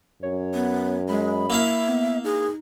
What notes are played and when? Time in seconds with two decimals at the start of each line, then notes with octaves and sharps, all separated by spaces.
0.23 F#2 C#5
0.54 B3
1.09 G#3 B5
1.50 A#3 E4 E5 F5
1.89 B3
2.25 D#4 G#4